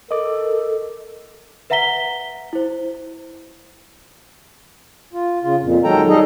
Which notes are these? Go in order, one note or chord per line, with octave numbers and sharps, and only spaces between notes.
A4 A#4 D#5 D6
B4 E5 F#5 A#5 B6 G7
E4 C5
F4
C#3 F4
F2 A#2
D#3 F#3 G#3 A4 G5 A#5
G3 D#4 G#4 A4 D#5